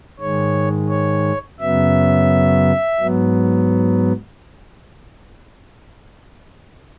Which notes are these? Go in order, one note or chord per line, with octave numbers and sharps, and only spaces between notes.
G#2 D#3 G#3 C#5
C#5
F#2 C#3 F#3 B3 E5
G#2 F#3 B3